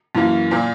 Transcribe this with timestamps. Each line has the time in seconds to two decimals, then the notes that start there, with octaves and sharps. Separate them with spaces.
0.15 F#2 E3 A#3
0.51 A#2 A#3